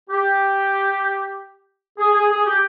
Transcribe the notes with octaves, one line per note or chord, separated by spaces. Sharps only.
G4
G#4
G#4
G#4
G4